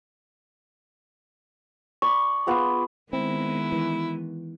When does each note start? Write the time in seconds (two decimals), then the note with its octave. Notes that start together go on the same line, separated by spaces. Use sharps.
2.02 D5 B5 C#6
2.47 B3 F4 G#4
3.13 D#3 G#3 B3 C4 E4
3.72 E3